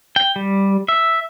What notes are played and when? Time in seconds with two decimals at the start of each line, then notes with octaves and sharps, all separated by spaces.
0.16 G5
0.36 G3
0.88 E5